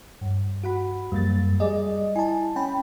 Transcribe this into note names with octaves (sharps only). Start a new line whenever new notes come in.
G2
F#4 F#5 B5
F#2 G3 A#3 A6
G3 G#4 D5 D#5
E4 G#5 A5
C#4 G5 B5